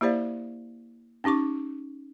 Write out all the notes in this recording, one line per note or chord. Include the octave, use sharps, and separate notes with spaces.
A#3 E4 G4 C5 D5 F5
C#4 D#4 G4 C#6 D6